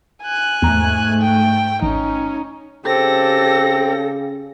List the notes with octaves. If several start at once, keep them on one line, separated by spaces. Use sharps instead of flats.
G#5 F#6
E2 G#2 A3 A#5
G5
A1 C#4 D#4
C#3 C4 G4 A4 A#6